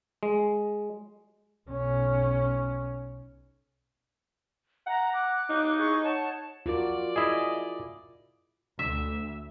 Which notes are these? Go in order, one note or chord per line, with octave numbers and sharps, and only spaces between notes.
G#3
B1 C#4
F#5 A#5
D6 F#6
D#4
E4 G#4 C#6
C#5 F#5 A5
F4 F#4 A#4 D5
E4 G#4 D#5
D2 E5